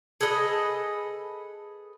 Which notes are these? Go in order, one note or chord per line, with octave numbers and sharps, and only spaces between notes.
G#4 A4 B4 D#5